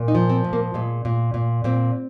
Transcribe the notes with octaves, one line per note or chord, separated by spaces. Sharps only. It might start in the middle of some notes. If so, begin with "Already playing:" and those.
Already playing: A#2
D#4
F3
C4
A#2
A#3
A#2 G#3
A#2
A#2
A#2 C4